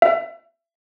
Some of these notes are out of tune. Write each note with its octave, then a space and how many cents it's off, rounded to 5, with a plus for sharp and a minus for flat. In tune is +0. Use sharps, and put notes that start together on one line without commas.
E5 +30